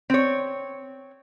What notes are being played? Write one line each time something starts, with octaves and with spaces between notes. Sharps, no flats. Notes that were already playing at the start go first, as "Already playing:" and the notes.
C4 C#5